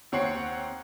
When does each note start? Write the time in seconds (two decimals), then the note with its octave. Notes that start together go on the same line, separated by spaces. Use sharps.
0.12 D#2 C4 C#5 F#5 G5 C7